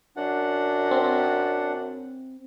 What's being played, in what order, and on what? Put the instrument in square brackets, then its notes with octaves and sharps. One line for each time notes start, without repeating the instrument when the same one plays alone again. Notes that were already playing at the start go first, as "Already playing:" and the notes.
[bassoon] F#2 [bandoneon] D4 F#5
[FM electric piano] C4